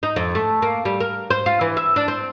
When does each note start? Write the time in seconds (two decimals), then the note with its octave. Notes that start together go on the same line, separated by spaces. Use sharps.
0.03 D#4
0.16 F2
0.35 A3
0.62 A#3
0.85 G3
1.00 A#4
1.30 C5
1.46 F4
1.61 E3
1.77 E5
1.96 D4
2.08 C4